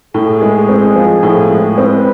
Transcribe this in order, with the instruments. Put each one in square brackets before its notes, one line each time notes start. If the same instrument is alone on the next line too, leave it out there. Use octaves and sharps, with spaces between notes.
[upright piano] A2 [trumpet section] G#4
[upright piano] G#3
C4
F3
A2
G#3
[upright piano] C4 [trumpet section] B4